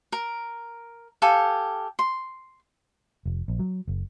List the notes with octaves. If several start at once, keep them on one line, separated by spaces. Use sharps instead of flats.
A#4
G4 A4 F5 G#5
C6
F1
A#1
F#3
F#1